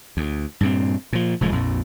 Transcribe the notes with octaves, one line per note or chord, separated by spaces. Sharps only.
D2
G2 A#2 C4
A#2 F3
F1 A2 F3 G#3
A#1 F2 A#2